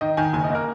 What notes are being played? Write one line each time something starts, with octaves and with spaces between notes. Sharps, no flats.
D#3 D#5
D#3 G#5
F#1 G#5
D#5
A#3
A#4